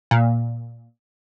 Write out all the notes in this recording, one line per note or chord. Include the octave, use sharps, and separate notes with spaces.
A#2